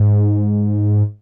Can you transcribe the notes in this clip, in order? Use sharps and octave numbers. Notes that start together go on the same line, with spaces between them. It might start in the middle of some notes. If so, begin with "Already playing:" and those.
Already playing: G#2